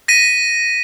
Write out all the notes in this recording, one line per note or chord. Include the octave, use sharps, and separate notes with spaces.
A#6 B6 D#7